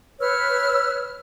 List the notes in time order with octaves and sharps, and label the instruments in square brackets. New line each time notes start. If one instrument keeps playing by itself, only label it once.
[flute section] B4 C#5 E6 F6